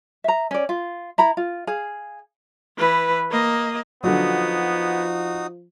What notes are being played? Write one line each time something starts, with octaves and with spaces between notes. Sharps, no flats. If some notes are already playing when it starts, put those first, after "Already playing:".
E5 A#5
C#4 D5
F4
E4 A#5 B5
F4
G#4 F5
E3 B4
A#3 D#5
D3 F3 F#3 B3 D#4 F#4 D#6